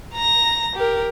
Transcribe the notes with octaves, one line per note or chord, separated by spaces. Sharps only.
A#5 A#6
G4 A#4